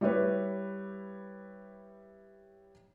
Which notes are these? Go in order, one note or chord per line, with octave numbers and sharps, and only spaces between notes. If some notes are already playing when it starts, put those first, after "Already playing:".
G3 E4 G4 B4 C#5